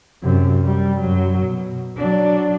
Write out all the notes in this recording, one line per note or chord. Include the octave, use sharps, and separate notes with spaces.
F#2 C3
G3
F#2 F#3
B2
F#3 D4